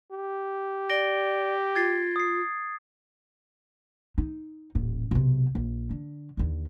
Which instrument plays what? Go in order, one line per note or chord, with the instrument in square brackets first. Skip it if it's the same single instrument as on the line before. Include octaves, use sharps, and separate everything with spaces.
[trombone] G4
[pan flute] D5 [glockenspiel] A#6 D7 G7
[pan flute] F4 [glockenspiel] G#6 A6 C7
[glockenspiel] D#6 C7
[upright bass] D#4
D#1 A1
B1 C3
A#1
D3
D#2 D3